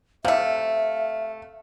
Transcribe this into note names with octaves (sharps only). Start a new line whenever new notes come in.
C3 A3 E5 F5